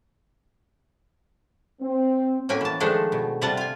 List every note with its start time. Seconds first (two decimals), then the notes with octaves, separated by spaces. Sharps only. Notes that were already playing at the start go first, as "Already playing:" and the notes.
1.82 C4
2.49 A2 F#3 A#3 C#4 G5 G#5
2.61 E3 A5
2.80 D#3 F3 G#3 A3 D4 A4
3.12 B2
3.41 C3 G3 F4 F#5 A5
3.57 F4 G#5